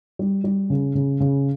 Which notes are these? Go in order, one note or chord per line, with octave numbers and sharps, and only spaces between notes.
G3
G3
C#3
C#3
C#3